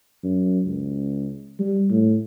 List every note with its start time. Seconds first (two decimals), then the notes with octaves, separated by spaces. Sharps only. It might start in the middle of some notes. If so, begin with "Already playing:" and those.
0.23 F#2
0.66 C#2
1.59 G3
1.90 A2